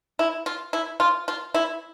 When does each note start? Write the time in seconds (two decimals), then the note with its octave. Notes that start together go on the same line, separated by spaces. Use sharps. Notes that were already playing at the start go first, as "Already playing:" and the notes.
0.19 E4
0.46 F4
0.73 E4
1.00 F4
1.28 F4
1.54 E4